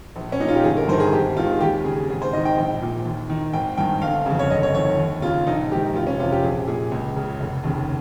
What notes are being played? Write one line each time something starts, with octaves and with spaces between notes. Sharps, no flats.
A#1
C#4
A#2 D#4
F4
G4
G1 G#4
A#4
G2 D#3 C5
G#4
G#1 G4
G#2 D#3 F4
G#4
D#2 G4
C#3 G#4
G#1 G#4
C5
G#2 D#3 D#5
G5
A#1
A#2
D#2
D#3
G#1 G5
G2 D#3 G5
G1 F5
C#3
F2
C#5
G1 D#5
C#5
F2 D#3 C#5
D#2
C#3 F4
A#1 D#4
G#2 D#3 G4
F1 F4
C#4
C3 F4
F2
G4
A#1 G#4
A#2 G#4
C#2
C#3
F1
D#2 C#3